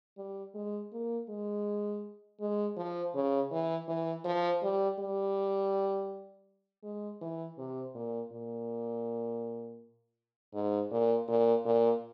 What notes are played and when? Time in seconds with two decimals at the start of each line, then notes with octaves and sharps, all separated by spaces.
0.18 G3
0.55 G#3
0.93 A#3
1.29 G#3
2.41 G#3
2.77 F3
3.15 C#3
3.51 E3
3.88 E3
4.25 F3
4.63 G3
5.00 G3
6.84 G#3
7.22 E3
7.58 C3
7.95 A#2
8.32 A#2
10.54 G#2
10.91 A#2
11.28 A#2
11.65 A#2